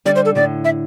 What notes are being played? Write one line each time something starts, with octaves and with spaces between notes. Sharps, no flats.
D3 G3 D5
C5
A4
A2 D3 D5
E5